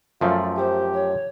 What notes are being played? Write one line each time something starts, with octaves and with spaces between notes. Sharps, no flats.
F#2 F3 A3 F4 D5
G4 C5
C#5